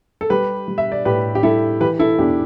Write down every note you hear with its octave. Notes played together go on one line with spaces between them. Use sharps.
A4
G3 G4 B4
G3
E5
D5
A2 G4 B4
G4
G3 E4 A4
E3 G4 B4
E4 A4
E2 D4 G4